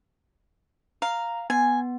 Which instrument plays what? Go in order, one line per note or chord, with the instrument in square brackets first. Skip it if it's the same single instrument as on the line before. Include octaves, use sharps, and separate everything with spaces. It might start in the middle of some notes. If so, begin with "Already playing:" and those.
[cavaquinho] F5 [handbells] A#5
[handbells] B3 [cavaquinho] G#5